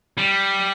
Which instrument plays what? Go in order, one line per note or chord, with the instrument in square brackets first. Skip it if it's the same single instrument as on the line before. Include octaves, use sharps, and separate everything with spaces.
[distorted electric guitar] G3